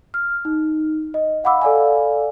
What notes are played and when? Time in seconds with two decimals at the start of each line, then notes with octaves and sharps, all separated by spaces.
0.14 F6
0.45 D#4
1.14 D#5
1.44 F5 F#5 B5 D6 E6
1.62 A4 D5 F5 G#5